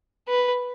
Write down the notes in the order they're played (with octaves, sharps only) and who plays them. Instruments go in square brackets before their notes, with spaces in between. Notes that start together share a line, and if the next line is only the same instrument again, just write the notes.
[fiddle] B4